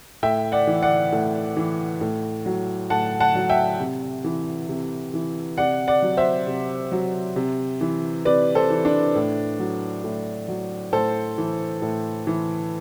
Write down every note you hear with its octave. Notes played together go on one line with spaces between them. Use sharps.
A2 E5 G5
D5 F#5
E3
D5 F#5
A2
E3
A2
F#3
A2 F#5 A5
F#5 A5
F#3
E5 G5
C3
E3
C3
E3
C3 D5 F#5
D5 F#5
F#3
C5 E5
C3
F#3
C3
E3
C3 B4 D5
A4 C5
E3
D4
A2
F#3
A2
F#3
A2 A4 C5
E3
A2
E3